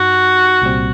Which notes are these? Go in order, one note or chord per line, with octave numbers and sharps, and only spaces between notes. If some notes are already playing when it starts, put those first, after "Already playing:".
Already playing: G2 D#4 F#4
C2 A#2 G3 C4